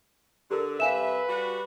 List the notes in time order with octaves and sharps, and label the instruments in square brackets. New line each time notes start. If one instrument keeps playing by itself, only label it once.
[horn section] D3 [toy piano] G4 A4 A#4
[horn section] C3 G3 E5 [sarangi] B4 [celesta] F5 G#5 E7
[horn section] G3 F#4